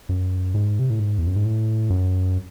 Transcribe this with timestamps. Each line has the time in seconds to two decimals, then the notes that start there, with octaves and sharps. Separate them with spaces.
0.09 F#2
0.54 G#2
0.79 C3
0.90 A2
0.99 G#2
1.18 E2
1.27 F#2
1.36 G#2
1.45 A2
1.90 F#2